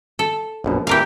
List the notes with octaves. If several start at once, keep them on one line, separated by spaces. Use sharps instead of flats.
A4
A#1 F#2 B2
A#2 E3 G4 A#4 F5